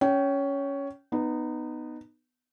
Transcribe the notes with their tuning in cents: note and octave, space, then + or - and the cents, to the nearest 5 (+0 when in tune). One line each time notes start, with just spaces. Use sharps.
C#4 +10 G5 -20
B3 +0 D#4 -20